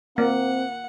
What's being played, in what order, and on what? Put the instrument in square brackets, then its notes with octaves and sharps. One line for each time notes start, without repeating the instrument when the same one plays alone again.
[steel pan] A#3 [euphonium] C4 [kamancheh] F#5